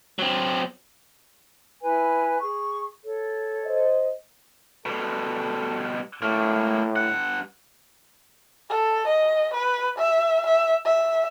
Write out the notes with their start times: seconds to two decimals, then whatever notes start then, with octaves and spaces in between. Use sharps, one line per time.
0.19 F#3 C4
1.81 E4 B4 G#5
2.40 G#4 C#6
3.04 A4 C#5
3.65 C5 D#5
4.86 B2 G3 A4
6.22 A2 A3 A#3
6.96 G2 F#5
8.69 A4
9.07 D#5
9.54 B4
9.98 E5
10.46 E5
10.85 E5